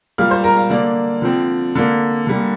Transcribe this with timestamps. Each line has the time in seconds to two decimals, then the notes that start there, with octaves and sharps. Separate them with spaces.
0.18 A#2 G3 A#3 F5 F6
0.31 C5 C6
0.44 A#4 A#5
0.58 F5
0.70 D3 A#3 D5
1.22 D3 F3 C4
1.75 D3 A#3
2.27 D3 G3 A#3